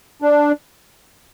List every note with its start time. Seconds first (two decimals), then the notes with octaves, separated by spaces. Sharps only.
0.22 D4